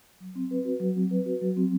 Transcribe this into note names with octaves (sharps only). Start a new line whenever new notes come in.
F#3
C4
B4
F#4
F#3
C4
B4
F#4
F#3
C4